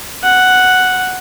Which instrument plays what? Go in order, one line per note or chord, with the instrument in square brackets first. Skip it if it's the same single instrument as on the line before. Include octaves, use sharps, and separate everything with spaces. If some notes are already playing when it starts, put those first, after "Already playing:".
[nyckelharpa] F#5